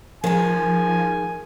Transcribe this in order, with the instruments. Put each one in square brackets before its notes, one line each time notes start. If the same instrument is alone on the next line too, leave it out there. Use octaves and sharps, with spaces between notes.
[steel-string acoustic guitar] D#3 G#3 [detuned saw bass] F3 [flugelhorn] G#5